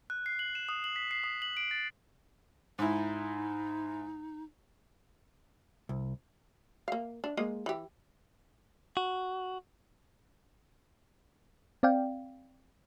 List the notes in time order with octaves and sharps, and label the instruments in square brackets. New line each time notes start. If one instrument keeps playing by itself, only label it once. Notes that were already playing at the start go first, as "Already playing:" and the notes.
[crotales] F#6
C7
F#7
E7
D#6
F#7
B6
C7
D#6
F#7
D7
A6
[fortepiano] G#2 E4 [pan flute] D#4
[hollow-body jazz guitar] C2
[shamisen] A#3 F5
D4
G#3 A#3 D#5
E3 G4
[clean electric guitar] F#4
[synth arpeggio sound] C4 D5 F5 G5